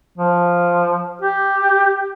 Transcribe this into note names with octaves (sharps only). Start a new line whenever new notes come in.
F3
G4